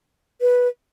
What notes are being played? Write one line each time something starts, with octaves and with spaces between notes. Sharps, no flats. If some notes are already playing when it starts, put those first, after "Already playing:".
B4